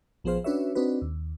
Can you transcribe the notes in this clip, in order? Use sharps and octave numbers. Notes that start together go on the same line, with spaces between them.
A#1 F3 B3 G#4 C5 F5
C#4 D4 F#4 B4 C#5 E5
C4 D4 D#4 F#4 B4
D#2